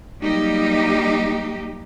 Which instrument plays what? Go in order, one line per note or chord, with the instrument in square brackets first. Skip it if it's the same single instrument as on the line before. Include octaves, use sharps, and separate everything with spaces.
[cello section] F#3 G3 A#3 D#4 G4